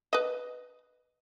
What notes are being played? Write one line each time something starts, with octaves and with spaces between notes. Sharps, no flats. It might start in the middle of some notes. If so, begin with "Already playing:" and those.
B4 D#5